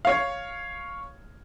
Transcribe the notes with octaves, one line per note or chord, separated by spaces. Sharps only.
C#5 F5